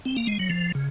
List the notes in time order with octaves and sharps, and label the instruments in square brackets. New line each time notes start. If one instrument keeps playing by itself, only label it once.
[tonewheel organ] C4
A#3
G#3
F#3
F3
C#3